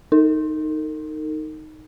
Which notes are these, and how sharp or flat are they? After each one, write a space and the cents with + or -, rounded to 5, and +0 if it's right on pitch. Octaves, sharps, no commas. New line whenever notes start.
D#4 +0 A#4 -45